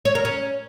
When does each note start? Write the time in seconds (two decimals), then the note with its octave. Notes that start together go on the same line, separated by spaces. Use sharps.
0.05 C#5
0.15 A#4
0.25 C#4